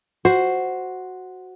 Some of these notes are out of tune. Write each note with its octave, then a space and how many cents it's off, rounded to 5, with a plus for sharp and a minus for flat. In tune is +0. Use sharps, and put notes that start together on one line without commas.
F#4 +0 C5 +0